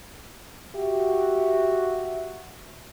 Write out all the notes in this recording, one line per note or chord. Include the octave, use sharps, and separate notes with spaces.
F#4 G4 E5